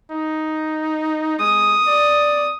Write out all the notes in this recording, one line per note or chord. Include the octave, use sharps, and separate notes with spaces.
D#4
G#3 D#6
D5